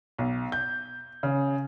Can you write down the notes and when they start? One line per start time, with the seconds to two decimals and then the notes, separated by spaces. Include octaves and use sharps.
0.18 B1
0.52 G6
1.23 C#3